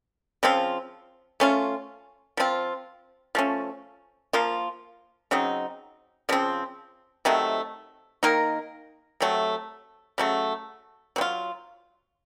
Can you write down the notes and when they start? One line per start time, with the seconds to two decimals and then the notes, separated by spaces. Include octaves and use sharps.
0.43 C#3 F3 C4 F4
1.40 A3 C#4 F4
2.37 F3 C4 F4
3.35 F3 A3 C#4
4.33 F3 A#3 F4
5.31 C#3 F#3 C4 D#4
6.29 C#3 F3 C4
7.25 C3 D#3 F#3 A3
8.23 D#3 A#3 D#4 A#4
9.20 C3 F#3 A3
10.18 C#3 F#3 A3
11.16 F#3 C4
11.21 F4